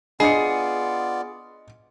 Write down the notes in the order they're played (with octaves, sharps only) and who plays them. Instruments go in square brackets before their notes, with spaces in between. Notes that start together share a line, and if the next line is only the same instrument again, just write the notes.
[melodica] B3 F4 D5 [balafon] D4 [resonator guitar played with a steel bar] G#4 [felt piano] D#5 C#7